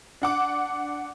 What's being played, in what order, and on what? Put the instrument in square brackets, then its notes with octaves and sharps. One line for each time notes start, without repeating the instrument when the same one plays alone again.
[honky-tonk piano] D4 F#5 D6